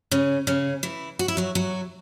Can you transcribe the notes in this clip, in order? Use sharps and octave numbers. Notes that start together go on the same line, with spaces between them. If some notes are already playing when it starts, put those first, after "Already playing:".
C#3 C#4
C#3 C#4
E3 E4
F#4
E4
F#3 F#4
F#3 F#4